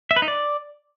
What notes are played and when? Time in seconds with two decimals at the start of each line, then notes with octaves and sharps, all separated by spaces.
0.11 E5
0.16 B4
0.22 D#4
0.28 D5